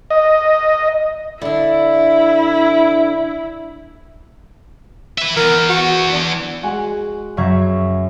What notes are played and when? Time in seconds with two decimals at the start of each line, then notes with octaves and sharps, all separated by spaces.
0.10 D#5
1.42 D3 D4 E4
5.18 B4 E5
5.36 E3 B3 A#4
5.69 F#4
6.13 D4
6.63 G#3 F#4 F#5 G#5
7.37 F#2 C#3 F#3 C#4 E5 G#6